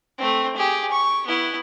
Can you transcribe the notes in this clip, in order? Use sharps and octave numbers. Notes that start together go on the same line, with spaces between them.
A3 C4
G4 G#4
C#6
B3 E4